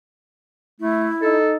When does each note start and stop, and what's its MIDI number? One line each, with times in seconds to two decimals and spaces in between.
0.80 1.09 57
0.80 1.38 64
1.22 1.57 63
1.22 1.53 69